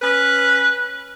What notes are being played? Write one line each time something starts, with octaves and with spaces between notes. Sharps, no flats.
C#4 B4